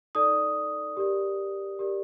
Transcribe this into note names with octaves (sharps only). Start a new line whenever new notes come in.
D#4 A4 D5 D#6
G4 A#4 D5
G4 A#4 D5